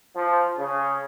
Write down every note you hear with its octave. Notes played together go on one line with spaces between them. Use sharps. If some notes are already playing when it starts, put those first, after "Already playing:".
F3
C#3